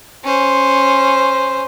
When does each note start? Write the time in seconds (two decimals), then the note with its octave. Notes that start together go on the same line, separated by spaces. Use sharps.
0.24 C#4 C5